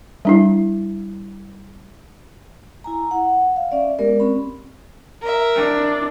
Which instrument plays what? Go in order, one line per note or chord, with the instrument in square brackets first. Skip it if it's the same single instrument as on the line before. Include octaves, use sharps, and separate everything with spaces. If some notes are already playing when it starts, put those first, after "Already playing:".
[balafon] G3 D4 E4
[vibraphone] E4 G#5 A#5
F#5
F5
C#4 D5 E5
G#3 B3 G4 A#4 D5
C4 C#4 B5
[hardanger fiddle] A#4 E5
[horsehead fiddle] D4